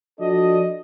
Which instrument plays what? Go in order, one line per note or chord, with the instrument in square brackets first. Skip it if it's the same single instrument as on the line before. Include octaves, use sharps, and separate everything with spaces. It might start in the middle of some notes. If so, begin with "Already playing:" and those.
[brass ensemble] F3 D4 F#4 A4 D5 D#5